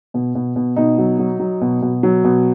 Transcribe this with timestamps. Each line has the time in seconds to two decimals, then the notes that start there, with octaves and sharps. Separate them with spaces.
0.14 B2
0.35 B2
0.56 B2
0.76 B2 D#4
0.98 F#3
1.19 F#3
1.40 F#3
1.61 B2
1.82 B2
2.03 F#3
2.24 B2